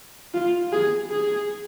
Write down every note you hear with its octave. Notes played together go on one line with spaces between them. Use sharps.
F4
G#4
G#4